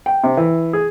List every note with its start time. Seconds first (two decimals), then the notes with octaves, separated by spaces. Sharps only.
0.06 G5
0.24 C3
0.37 E3
0.73 G#4